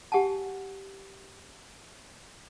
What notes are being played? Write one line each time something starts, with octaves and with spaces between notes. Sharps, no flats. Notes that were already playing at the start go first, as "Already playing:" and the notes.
G4 F#5 G#5 A5